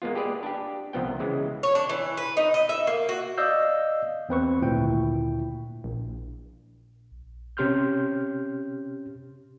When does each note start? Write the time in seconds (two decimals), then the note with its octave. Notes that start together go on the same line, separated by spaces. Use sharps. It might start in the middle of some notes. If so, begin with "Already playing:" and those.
0.02 G#3 A#3 B3 F4
0.15 G4 G#4 B4 D5
0.43 D4 G4
0.93 C2 F3 B3 G5
1.20 C#3 E3 G#3
1.63 C#5
1.75 D4
1.89 E3
2.17 B4
2.37 D#4
2.54 D#5
2.69 E5
2.87 A#3
3.09 F#4
3.38 D5 D#5 F5 E6 G6
4.29 E2 C4 B4 C#6
4.61 G#1 D2 A#2 E4 G5
5.84 A#1
7.57 C3 C#4 G4 C6 F6 G6